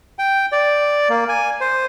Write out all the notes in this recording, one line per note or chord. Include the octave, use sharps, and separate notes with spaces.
G5
D5
A#3
G#5
C5